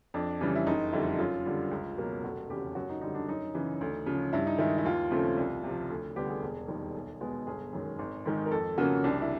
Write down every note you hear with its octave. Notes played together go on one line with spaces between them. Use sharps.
F2 D4
C#3 E3 G3
E4
F#1 D#4
F2 D3 G3 E4
F#2 F4
D3 G3
C#2
B2 F#3 A#3
F1 F#4
E2 C#3 G4
F#2 F#4
D#4
D3 G3 D#4
D4
F#2 D#4
C#3 E3
D2
C#3 F3
G2 E4
D#4
D#3 G#3 E4
E4
D#2 F4
C#3 F3 A3 C4
C2
C3 F3
D2
D3 G3 B3 G4
G#4
E1
D#2 D#3 G3
B1
B2 G#3 B3
G1 G#4
F#2 D#3 G#3
G#1
G#2 D#3 G#3
A#4
F2 A4
C#3 F3 A#3 F#4
C2 D4
E4